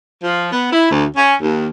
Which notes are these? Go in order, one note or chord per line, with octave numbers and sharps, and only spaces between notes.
F3
B3
E4
D2
C#4
D#2